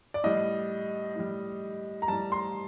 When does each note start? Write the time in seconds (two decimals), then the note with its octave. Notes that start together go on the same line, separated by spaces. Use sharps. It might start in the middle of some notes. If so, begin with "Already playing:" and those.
0.14 D5
0.24 A2 G3 D#5
1.15 A2 G3
2.02 A#5
2.08 A2 G3 A5
2.32 C6